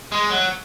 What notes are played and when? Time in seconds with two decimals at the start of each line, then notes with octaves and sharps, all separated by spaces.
0.12 G#3
0.30 F#3